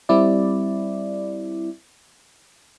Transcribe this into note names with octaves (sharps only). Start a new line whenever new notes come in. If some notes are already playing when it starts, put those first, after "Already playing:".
G3 C4 E4 D5